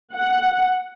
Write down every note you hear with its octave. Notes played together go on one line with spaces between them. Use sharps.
F#5